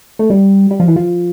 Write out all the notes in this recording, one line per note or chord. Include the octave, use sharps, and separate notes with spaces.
A3
G3
G3
F3
E3
F3